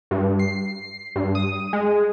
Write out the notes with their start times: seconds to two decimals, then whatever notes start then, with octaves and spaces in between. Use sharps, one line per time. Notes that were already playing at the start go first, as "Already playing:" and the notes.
0.11 G2
0.39 C7
1.16 G2
1.35 D#6
1.73 G#3